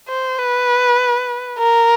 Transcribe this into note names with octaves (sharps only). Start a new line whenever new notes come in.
C5
B4
A#4